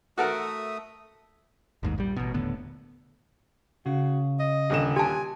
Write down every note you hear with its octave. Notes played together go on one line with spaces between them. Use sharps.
A3 F#4 A4 A#4 E5 D#6
A1 D#2 G#2
A#1 G3
A1 B2
D#1 A2 D3 B3
C#3 F#4
D#5
D#1 D3 E7
G4 G#5 A5